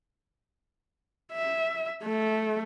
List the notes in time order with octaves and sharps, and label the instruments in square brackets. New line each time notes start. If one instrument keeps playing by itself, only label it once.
[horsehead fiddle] E5
A3